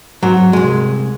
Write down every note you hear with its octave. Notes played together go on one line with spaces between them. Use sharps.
G#2 F#3
C2 G#3